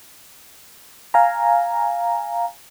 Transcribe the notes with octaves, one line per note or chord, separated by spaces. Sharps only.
F5 G#5 A#5